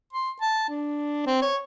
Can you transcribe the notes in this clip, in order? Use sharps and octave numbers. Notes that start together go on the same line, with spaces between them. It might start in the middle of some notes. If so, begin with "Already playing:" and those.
C6
A5
D4
C4
C#5